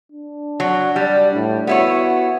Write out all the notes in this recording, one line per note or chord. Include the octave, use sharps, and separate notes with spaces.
D4
F#3
G3
A2
B3 E4 F#4 C#5